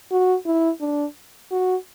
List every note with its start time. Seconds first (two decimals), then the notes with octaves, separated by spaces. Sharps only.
0.11 F#4
0.45 E4
0.80 D4
1.51 F#4